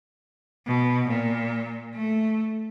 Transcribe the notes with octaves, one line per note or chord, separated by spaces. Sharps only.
B2
A#2
A3